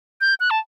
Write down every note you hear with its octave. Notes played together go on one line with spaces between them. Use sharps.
G6
F#6
A5